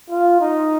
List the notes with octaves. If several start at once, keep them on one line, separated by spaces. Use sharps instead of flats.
F4
D#4